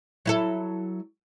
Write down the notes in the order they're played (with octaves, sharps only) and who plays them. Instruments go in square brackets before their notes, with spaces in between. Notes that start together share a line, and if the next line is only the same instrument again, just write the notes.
[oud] F#3 E4 A4